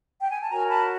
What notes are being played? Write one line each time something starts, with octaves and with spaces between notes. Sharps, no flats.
G5
G#5
A5
F#4 A#4 C#5 G#5 A#5
A5 B5